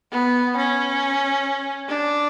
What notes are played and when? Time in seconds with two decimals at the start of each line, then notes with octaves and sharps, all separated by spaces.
0.12 B3
0.57 C#4
1.89 D4